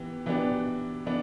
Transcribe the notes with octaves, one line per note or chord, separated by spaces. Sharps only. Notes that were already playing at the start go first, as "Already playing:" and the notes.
Already playing: E3 B3 G4
E3 B3 D4 G4
E3 B3 D4